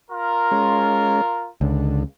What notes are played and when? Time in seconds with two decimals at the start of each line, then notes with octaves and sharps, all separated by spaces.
0.11 F4 A#4
0.52 G#3 C#4
1.61 C#2 D3